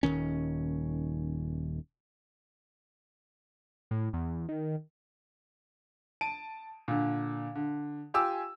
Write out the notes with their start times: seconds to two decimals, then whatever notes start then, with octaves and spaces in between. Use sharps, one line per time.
0.03 D#1 D#2 D#3 C#4
3.91 A2
4.13 E2
4.49 D#3
6.21 A5 D7 D#7
6.88 A#2 D3
7.55 D3
8.14 F4 G4 G#5 D6 E6